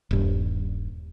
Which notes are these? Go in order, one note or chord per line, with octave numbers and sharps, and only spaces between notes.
D#1 G2